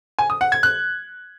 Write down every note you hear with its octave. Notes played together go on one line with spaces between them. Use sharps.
G#5
D#6
F#5
G#6
F#6